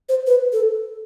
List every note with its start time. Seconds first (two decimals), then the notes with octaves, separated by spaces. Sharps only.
0.09 C5
0.27 B4
0.53 A4